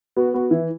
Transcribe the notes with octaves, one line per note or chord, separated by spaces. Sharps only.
B3 F#4
B3 F#4
E3 E4